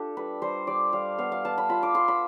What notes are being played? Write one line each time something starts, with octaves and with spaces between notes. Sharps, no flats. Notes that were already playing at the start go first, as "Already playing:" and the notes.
Already playing: D4 F4 G4 A4
G3 B4
G3 C5
G3 D5
G3 F5
B3 F5
F5
B3 A5
B5
F4 B5
D6
F4 C6
B5